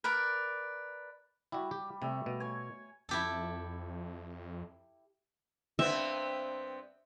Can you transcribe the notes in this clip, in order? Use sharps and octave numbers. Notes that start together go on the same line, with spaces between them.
A#4 B4 D5
G3 E4 F#4
G4
C3 G3 A3
B2
C#5 G#5
F2 E4 G4 A4
G2 B3 C4 E5